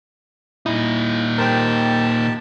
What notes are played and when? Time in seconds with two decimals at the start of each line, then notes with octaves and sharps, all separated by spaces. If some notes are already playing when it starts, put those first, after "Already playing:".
0.66 A#2 D#4 E4
1.38 G4 A#4 C5 G5 A5